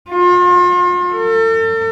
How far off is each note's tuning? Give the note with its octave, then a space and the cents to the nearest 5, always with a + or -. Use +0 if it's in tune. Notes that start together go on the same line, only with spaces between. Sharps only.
F4 +40
A4 +40